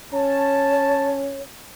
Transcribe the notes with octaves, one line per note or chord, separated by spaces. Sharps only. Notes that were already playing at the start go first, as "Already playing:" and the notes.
C#4 C#5 A5